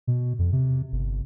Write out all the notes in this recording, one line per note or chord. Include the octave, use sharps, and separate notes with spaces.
B2
F2
C3
G1